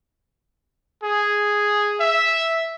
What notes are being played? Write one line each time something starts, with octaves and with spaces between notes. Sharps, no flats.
G#4
E5